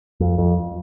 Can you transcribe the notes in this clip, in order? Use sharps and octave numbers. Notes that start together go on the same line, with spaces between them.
F2
F2